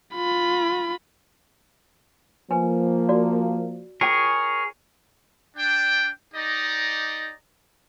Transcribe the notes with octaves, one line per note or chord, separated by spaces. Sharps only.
F4 B5
F3 A#3 B4 G#5
F#4 D5
F4 G#4 A#4 C#5 G5 D6
D4 G5
D#4 G4 D5 D#5 A#5